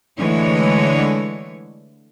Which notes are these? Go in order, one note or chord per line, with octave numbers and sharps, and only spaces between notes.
D3 E3 G#3 A3 C#5